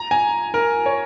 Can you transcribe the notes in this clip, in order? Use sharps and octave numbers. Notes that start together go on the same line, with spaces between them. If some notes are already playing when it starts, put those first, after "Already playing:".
Already playing: A#5
G#5
A#4
C#5